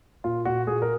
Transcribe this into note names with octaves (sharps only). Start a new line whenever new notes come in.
A#2 F4
A#2 F#4
A#2 G#4
A#4